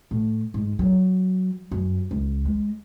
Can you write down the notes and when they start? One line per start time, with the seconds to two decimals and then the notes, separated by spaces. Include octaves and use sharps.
0.11 A2
0.54 G#2
0.79 F#3
1.71 F#2
2.11 C#2
2.45 G#3